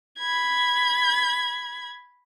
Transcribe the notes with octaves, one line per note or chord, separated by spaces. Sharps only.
B5 G#6